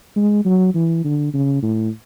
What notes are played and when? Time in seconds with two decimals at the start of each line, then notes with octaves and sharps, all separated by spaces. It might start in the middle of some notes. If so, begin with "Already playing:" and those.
0.16 G#3
0.45 F#3
0.74 E3
1.04 D3
1.34 C#3
1.62 A2